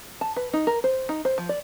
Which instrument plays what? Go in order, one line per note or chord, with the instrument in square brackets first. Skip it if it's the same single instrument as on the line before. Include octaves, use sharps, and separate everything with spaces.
[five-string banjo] A5
B4
D#4
A#4
C5
D#4
C5
F3
D5